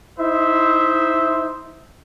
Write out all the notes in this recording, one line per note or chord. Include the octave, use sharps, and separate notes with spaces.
D#4 E4 C5 D#5 E5